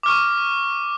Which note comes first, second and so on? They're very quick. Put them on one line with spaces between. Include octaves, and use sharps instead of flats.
D6 F6 C#6